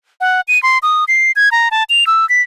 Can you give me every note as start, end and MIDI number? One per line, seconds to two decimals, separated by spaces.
0.21 0.41 78
0.48 0.61 99
0.63 0.78 84
0.83 1.04 87
1.08 1.32 96
1.36 1.49 92
1.52 1.68 82
1.71 1.84 81
1.89 2.07 101
2.07 2.28 88
2.29 2.42 95